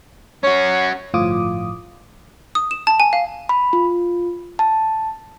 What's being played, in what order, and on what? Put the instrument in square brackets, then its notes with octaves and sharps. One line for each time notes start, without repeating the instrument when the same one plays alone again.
[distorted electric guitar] C#4 F#4 [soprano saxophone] C#5
[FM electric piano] G1 A2 F3 F4 D6 D#6
[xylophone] D#6
E7
A5
G#5
F5
[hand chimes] B5
F4
A5